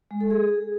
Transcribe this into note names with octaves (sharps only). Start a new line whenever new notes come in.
G#3
A4
G#4